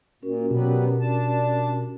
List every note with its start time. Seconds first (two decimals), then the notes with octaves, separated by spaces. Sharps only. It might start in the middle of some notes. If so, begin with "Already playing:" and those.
0.23 A#2 C#4 F#4 A#4
0.51 B2 F#3 G3 B3 G4
1.00 D4 A5